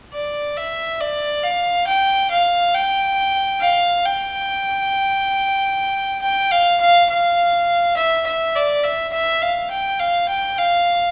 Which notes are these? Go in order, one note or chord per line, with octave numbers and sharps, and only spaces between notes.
D5
E5
D5
F5
G5
F5
G5
F5
G5
G5
F5
F5
F5
E5
E5
D5
E5
E5
F5
G5
F5
G5
F5